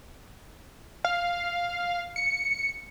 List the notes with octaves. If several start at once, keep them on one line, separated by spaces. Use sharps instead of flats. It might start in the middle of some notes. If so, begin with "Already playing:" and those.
F5
C#7